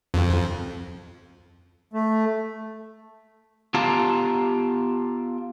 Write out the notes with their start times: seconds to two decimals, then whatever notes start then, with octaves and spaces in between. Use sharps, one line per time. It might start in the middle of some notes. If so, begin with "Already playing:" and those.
0.14 F2
1.93 A3
3.74 B3 F4 G4 F5 A5 A#5